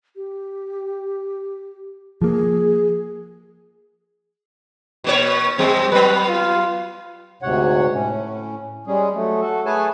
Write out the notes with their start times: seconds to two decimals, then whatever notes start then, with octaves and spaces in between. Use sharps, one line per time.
0.16 G4
2.22 F3 A#3 G#4
5.04 B2 A#3 C#5
5.58 F#2 G3 C4
5.92 F#3 B3 B4
6.29 F4
7.42 D2 G#2 C3 C#5 F#5
7.93 A2 C#4
8.87 G3 G#3 C#4 G#4
9.14 F#3 A3
9.41 F#4 A4
9.66 A3 G#4 B4 C#5 G#5 A5